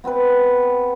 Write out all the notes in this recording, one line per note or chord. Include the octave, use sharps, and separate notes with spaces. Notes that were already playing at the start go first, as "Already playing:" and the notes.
B3 C4 G4 B4